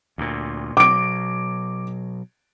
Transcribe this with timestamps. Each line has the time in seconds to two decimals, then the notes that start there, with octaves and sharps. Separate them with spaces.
0.18 D2 A#2
0.77 B2 F#3 D6 D7